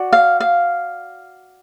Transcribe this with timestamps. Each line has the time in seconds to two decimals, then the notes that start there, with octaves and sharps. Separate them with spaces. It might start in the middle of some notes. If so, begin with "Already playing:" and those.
Already playing: F#4 D5
0.13 F5
0.40 F5